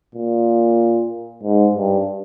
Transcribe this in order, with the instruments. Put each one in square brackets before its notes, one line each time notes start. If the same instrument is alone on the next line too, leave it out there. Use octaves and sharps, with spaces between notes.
[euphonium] A#2
G#2
G2